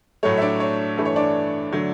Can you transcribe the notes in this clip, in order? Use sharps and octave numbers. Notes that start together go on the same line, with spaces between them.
A2 F#3 A3 C#5
E5
D4 D5
C#5
G2 E3 A3
C#5
D4 D5
D3 F#3 A3